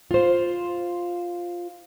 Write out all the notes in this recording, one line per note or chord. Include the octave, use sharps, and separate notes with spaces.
F4 C5